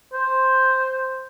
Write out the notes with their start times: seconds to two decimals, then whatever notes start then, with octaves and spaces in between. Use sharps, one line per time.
0.13 C5